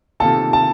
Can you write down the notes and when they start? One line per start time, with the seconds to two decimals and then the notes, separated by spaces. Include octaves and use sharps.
0.20 C3 D#3 A#3 F4 A4 A5
0.53 A5